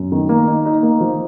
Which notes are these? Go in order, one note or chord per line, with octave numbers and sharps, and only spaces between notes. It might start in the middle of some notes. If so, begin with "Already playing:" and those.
Already playing: F#2
D#3
A#3
D#4
D#4
A#3
F3